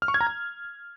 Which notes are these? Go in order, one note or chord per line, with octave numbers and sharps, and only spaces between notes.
F6
C#6
G#6
A#5
G#6